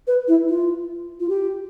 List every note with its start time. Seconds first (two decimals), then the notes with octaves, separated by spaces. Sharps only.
0.07 B4
0.28 E4
0.49 F4
1.20 F4
1.29 G4